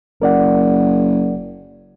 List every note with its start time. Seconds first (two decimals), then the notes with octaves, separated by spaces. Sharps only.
0.22 F#1 A#4 D5 F#5